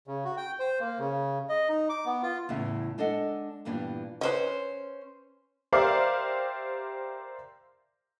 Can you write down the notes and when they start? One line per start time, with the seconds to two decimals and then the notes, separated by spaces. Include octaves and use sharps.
0.07 C#3
0.25 F#4
0.37 G5
0.59 C5
0.80 A#3
0.99 C#3
1.49 D#5
1.69 D#4
1.89 D6
2.06 B3
2.23 F4
2.49 E2 A2 C#3
2.98 G#3 D4 A4 D#5 F#5
3.65 G2 A#2 E3 G3 B3 D4
4.21 C#4 B4 C5 D#5
5.73 G4 A#4 C5 D5 E5 F5